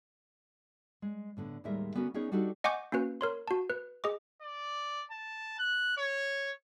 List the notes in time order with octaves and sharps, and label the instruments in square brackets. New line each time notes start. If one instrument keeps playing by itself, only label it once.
[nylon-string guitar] G#3
A2 D3 B3
D#2 A2 G3 G#3 A#4 E5
D3 B3 C#4 F#4 A#4
B3 C#4 D#4 G#4 A#4 C#5
G3 D4 D#4 F#4 G4 A4
[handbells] D#5 F#5 G#5 C#6 D6 G6
A#3 C#4 F#4 B4
A#4 C#5 C6
F#4 A5
B4
G#4 D#5 D6
[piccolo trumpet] D5
A5
F#6
C#5